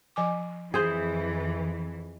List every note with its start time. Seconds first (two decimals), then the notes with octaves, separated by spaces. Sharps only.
0.16 F3 G#5 D6
0.74 F2 E3 G#4 C5